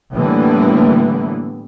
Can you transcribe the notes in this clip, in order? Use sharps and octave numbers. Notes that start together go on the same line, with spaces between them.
A2 D3 E3 G3 A#3 B3